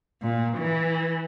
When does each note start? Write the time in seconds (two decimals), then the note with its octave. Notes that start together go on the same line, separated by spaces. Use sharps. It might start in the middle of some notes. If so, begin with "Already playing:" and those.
0.22 A#2
0.57 E3